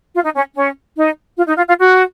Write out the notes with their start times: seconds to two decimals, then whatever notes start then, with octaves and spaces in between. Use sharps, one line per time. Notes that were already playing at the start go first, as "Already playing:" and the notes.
0.15 F4
0.24 D#4
0.35 C#4
0.55 C#4
0.96 D#4
1.37 F4
1.48 D#4
1.58 F4
1.68 F4
1.78 F#4